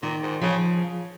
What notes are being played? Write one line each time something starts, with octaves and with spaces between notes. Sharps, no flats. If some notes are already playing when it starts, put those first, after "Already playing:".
A#2 D#3
G#2
C#3 F3